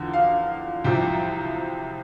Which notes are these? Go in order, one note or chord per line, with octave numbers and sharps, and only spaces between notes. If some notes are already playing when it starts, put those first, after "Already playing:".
Already playing: E2 D3 F3
F5
C2 C3 F3 G5